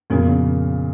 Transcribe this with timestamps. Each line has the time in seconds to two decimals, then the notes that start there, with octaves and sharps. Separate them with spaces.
0.10 F2 A#2 C#3 F3 B3 F#4
0.28 C#3